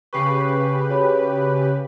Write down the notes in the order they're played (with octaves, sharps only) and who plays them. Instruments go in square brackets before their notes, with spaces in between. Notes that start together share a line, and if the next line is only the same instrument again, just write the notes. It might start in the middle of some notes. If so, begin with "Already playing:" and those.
[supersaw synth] C#3 G4 B4 [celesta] C#6 C7
[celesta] F#4 C#5 B5